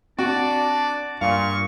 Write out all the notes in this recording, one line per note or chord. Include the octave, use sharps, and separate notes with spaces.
C4 D4 F#4 D5
G2 A#2 F5 C#6